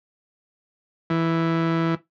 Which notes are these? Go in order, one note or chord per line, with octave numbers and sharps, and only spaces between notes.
E3